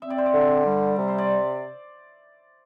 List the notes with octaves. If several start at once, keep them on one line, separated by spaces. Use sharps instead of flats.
C4 E5
D5
C5
D5
D3
G3
C3
C5
D5